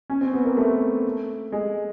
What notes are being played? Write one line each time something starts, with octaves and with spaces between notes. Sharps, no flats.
C#4
C4
B3
A#3
A3
G#3